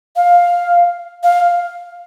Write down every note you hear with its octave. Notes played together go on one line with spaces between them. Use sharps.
F5
F5